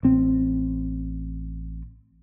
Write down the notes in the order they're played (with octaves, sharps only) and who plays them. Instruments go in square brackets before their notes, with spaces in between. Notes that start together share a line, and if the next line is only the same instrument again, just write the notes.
[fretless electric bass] A1 C4